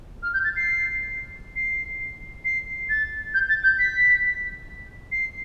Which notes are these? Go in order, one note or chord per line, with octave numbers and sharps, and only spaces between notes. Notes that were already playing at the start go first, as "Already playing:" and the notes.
F6
G6
A6
C7
C7
C7
A6
G6
A6
G6
B6
C7